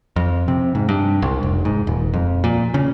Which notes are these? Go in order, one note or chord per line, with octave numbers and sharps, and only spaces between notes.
F2
C3
G#2
G2
C2
F1
G#2
D#1
F2
A#2
C#3